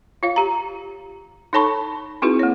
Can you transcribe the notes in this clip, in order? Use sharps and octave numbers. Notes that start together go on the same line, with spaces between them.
F4 C#5 F5
G4 A#5
D#4 A4 C#5 A5 B5 C#6
C4 D#4 E4 F#4 G#4 B4
A#3 C#5